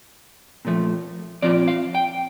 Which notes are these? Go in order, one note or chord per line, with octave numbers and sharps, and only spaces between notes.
A#2 F3 A3
A#2 F3 C4 F4 D5
F5
G5